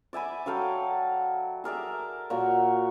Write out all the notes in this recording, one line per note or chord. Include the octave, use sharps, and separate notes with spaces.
D5 E5 G#5 B5
F#3 A4 F5 G5
G#4 A#4 D5 E5
A#2 F#4 A#4 C#5